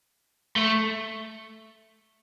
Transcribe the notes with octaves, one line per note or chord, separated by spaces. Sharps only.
A3